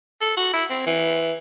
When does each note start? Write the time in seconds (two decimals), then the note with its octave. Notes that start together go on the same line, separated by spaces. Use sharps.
0.21 A4
0.37 F#4
0.53 E4
0.70 C4
0.86 E3